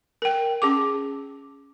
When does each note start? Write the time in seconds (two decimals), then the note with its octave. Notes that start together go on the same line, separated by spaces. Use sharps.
0.22 A#4 G5
0.62 C#4 G#4 D6